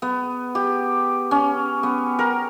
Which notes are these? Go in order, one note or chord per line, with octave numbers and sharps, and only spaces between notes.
B3
G4
C#4
B3
A#4